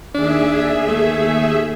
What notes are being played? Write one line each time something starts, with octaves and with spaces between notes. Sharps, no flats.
D#2 D4 G#4 E5
A3